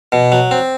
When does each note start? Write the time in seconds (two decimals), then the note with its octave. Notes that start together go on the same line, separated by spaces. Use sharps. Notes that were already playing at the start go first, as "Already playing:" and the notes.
0.12 B2
0.32 F#3
0.51 C4